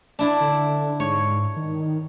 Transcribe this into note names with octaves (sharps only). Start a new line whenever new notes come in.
D4 E4 D5
D3
G#2 C#5
D#3